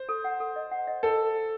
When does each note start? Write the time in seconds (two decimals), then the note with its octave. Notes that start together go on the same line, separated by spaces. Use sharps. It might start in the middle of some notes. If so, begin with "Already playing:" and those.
Already playing: C5
0.09 A4
0.24 F#5
0.40 A4
0.56 D#5
0.71 F#5
0.87 D#5
1.03 A4